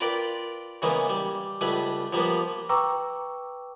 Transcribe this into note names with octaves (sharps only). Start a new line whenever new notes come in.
F4 A#4 B4 D5 G5
C#3 E3 G#3 A#3 B3
G3
C#2 G3 A3 B4
F3 G3 A#3 B3 B4
B4 G5 A#5 C#6 D6 E6